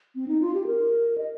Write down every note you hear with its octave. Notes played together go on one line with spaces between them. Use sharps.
C4
D#4
F4
G4
A#4
D#5